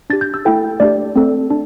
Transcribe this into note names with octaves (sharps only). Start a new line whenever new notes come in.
D4 G4 A6
G6
E6
A3 E4 A4 G5
A3 D4 G4 D5
A3 C4 A4
D4